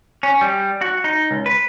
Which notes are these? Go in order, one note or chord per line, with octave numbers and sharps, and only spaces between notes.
C#4
G3
F#4
D#4
C#2
B4